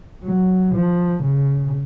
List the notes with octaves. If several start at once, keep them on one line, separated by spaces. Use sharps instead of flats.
F#3
F3
C#3